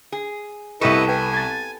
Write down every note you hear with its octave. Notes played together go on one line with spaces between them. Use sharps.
G#4
C2 B3 E4 G4 A4 B4 D#5 C#6
B4 G5 G#5
G#6 A6